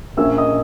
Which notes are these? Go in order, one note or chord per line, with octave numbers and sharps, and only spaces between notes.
A#1 A#2 A#3 C#4 E5 E6
D#5 D#6